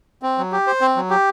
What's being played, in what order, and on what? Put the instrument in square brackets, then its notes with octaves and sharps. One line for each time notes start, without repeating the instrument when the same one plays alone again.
[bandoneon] C4
F#3
G4
C5
C4
F#3
G4